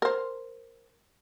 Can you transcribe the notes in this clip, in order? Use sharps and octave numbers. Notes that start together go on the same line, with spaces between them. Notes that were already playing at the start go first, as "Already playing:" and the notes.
A#4 C5